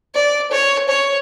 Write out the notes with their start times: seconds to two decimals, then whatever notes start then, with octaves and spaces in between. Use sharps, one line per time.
0.15 D5
0.51 C#5
0.88 C#5